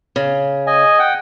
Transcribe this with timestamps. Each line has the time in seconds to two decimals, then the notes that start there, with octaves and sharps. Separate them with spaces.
0.16 C#3
0.67 D#5 G#5
0.99 F#5 G5